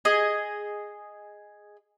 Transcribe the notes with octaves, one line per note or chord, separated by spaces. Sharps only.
G#4 D#5